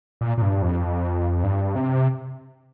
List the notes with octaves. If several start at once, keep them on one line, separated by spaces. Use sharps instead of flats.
A#2
A#2
G2
F2
G2
C3